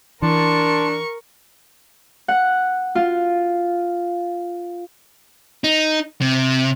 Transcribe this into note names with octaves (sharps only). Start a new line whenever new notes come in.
E3 D4 A#4 A5 C6 C#6
F#5
F4
D#4
C3